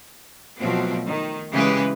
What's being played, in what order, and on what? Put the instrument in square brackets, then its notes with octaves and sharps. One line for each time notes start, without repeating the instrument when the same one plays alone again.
[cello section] B2 F3 F#3 A3 C4
D#3
C#3 E3 G#3 G4 G#4 B4